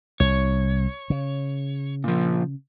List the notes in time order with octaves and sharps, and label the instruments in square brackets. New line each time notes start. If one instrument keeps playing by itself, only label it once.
[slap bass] C2 [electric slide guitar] C#5
[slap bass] C#3
[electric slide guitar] A#2 F3